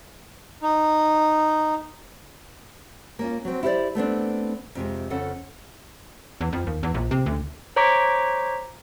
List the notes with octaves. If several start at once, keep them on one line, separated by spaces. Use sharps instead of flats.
D#4
A#3 C#4 F4
F#3 C4
E4 G4 A4 B4 C5 D5
A3 B3 C4 D4
F2 C3 G#3
F2 C#3 A4 F#5
E2
F2
D#2
E2
A#1
C3
D2
C5 C#5 A#5 C#6 D6 B6